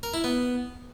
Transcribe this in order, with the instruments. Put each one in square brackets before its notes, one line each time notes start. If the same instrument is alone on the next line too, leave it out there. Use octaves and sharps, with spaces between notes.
[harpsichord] A#4
E4
B3